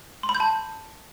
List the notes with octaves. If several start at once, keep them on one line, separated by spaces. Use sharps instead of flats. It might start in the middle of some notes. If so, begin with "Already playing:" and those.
C6
B5
G6
A5